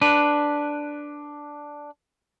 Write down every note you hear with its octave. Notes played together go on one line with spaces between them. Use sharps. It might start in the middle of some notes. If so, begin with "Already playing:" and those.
D4 B4